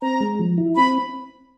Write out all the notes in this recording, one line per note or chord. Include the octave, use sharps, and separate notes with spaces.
C4 A#5
G#3
F3
E4
C4 B5